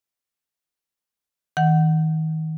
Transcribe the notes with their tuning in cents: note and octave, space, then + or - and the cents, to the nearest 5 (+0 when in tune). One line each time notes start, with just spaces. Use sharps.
D#3 +30 F#5 +0